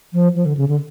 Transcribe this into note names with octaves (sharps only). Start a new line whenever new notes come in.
F3
F3
D3
C#3
D3